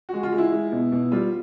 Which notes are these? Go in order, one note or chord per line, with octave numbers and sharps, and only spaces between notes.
G#3 F#4
F4
G#3
E4
G#3
B2
B2
G3 F4